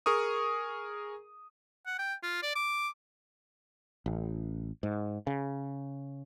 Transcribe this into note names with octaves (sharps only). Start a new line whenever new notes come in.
G#4 A#4 C#6 D#6
F#5
G5
F4
D5
D6
A1
G#2
C#3